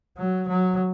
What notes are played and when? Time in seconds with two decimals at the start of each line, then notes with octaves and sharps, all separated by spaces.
0.18 F#3
0.49 F#3